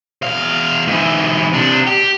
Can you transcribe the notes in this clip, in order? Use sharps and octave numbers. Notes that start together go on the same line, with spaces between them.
E2 F5
G#2 E3
C3 D4
G4